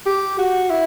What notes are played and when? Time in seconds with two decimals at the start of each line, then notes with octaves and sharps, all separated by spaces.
0.06 G4
0.39 F#4
0.70 E4